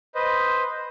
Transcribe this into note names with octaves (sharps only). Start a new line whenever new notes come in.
B4 C5 D#5